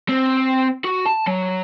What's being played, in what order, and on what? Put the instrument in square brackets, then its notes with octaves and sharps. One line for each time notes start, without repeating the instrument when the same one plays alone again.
[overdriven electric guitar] C4
F#4
A5
F#3